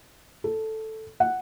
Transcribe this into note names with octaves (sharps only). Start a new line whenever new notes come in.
A4
F#5